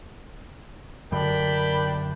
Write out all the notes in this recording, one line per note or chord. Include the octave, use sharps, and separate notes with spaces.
F#2 D3 D4 A#4 G5 B5